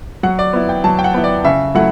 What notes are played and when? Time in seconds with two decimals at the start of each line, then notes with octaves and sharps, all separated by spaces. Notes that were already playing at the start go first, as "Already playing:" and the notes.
0.23 F#3 F#5
0.39 D5
0.53 B3 E4
0.69 G5
0.84 F#3 A5
0.99 G5
1.04 F#5
1.14 B3 E4
1.24 D5
1.44 C#3 E5
1.75 F#3 A3 E4 F#5